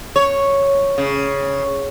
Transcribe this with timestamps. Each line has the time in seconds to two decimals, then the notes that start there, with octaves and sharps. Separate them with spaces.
0.16 C#5
0.98 C#3